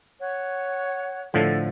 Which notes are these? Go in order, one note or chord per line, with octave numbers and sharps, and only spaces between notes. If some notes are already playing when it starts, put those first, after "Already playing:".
C#5 F#5 F#6
A2 D3 F3 A4